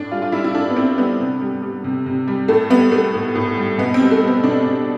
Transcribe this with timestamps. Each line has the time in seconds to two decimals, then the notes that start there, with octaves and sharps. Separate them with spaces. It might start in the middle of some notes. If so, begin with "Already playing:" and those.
Already playing: A2 D4
0.11 G3 F4
0.22 F4
0.32 G3 E4
0.44 E4
0.55 A2 D4
0.70 B3
0.76 A2 C4
0.98 G3 B3
1.20 C3
1.41 G3
1.62 G3
1.84 C3
2.06 C3
2.28 G3
2.48 A2 A3
2.70 G3 B3
2.92 G3 A3
3.14 A2
3.35 A2
3.58 G3
3.78 B2 B3
3.94 C4
4.00 G3
4.11 A3
4.22 G3
4.27 B3
4.43 B2 D4
4.66 B2